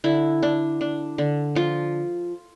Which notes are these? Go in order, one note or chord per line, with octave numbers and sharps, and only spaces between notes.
D3 E4
D4
D4
D3
F3 F4